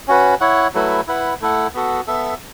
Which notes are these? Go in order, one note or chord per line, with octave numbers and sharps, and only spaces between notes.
C#4 F#4 B4
E4 C#5 F#5
F#3 A3 E4 B4
E4 B4 F#5
A3 E4 A4 F#5
B3 F#4 A4
B3 A4 E5